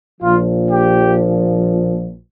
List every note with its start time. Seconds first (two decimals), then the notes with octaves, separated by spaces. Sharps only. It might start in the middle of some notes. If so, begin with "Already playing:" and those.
0.21 A#1 A#2 F3 F4
0.69 G4